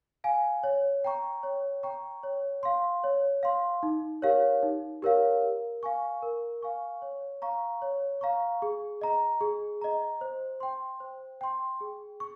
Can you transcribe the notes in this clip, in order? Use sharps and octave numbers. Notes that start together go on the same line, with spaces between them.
F5 G#5
C#5
G5 A#5 C#6
C#5
G5 A#5 C#6
C#5
F5 C6
C#5
F5 C6
D#4
G4 A#4 C#5 F5
D#4
G4 A#4 C#5 F5
A#4
F5 G#5 C#6
A#4
F5 G#5 C#6
C#5
F5 A#5 C#6
C#5
F5 A#5 C#6
G#4
D#5 A#5
G#4
D#5 A#5
C5
G5 C6
C5
G5 C6
G#4
C#6